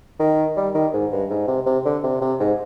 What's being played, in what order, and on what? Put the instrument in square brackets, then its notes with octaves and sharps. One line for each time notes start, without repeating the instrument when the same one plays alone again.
[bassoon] D#3
G3
D#3
G#2
G2
G#2
C3
C3
D3
C3
C3
G#2